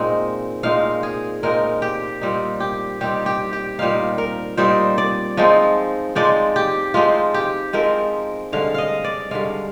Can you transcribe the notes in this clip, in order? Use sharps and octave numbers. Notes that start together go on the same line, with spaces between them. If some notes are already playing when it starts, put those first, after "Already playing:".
Already playing: A#2 G#3 C4 D#4
A#2 G#3 C4 D#4 F5
G#4
A#2 G#3 C4 D#4 A#4
G4
A#2 G3 C4 D#4
G4
A#2 G3 C4 D#4 G4
G4
G4
A#2 G3 C4 D#4 F5
A#4
A#2 G3 C4 D#4 C5
D5
F3 G#3 C4 D#4
F3 G#3 C4 D#4 D5
G4
F3 G#3 C4 D#4 F4
G4
F3 G#3 C4 D#4 A#4
G2 D3 G#3 F5
D#5 F5
D5
G2 D3 G#3 F5